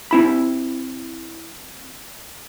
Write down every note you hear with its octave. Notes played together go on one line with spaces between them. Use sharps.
C4 E4 B5